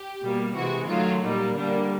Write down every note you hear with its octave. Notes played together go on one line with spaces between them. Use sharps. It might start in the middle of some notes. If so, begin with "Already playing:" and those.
Already playing: G4
B2 G3 A#3
C3 E3 G#3 F#4
D#3 F#3 A3 F4
A#2 G3 A#3 D#4
D3 G3 A#3 D4